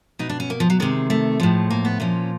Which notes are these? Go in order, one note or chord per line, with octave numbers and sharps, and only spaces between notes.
B2 D#4
D4
C#4
A#3
F3
F#3
C3 D#3 G#3
A3
A2 F3 G#3
A#3
B3
A#2 F3 C#4